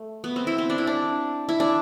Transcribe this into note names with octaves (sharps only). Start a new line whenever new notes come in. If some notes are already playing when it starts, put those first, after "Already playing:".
Already playing: A3
B3
C4
E4
C4
D4
E4
D4
E4
D4